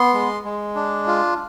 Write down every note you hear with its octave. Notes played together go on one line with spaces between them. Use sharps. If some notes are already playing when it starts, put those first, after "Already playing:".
Already playing: B3 C6
G#3
G#3
D4
F4